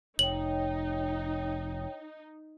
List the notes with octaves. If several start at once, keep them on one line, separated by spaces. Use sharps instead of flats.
F1 D#4 C#5 G5 F#7